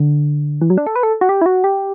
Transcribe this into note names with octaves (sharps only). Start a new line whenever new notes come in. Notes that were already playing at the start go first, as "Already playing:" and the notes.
Already playing: D3
E3
F#3
D4
A4
B4
A4
F#4
G4
E4
F#4
G4